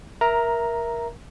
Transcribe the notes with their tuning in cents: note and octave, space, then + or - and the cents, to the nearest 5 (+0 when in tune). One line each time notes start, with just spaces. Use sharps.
A#4 +15 E5 +0 A#5 +0